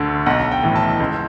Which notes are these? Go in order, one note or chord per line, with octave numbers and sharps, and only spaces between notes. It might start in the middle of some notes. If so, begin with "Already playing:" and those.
Already playing: D2 D3
B1 F#5
G5
A2 E3
A5
C#2